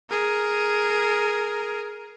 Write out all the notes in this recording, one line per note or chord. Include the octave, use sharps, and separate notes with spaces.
G#4 A#4